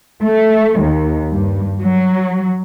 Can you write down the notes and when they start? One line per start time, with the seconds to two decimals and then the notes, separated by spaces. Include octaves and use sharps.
0.24 A3
0.80 D#2
1.33 G2
1.80 F#3